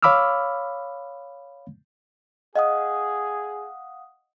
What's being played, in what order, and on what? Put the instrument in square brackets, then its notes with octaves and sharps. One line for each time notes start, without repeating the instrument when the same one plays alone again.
[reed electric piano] C#5 F5 B5 D6 E6 F6
[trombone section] G#4 [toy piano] D#5 [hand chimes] F5 F#5 D#6